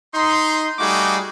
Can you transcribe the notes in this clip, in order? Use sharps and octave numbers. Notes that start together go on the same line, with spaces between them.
D#4 C6
G3 A3 D#4 F#4 G#4 D6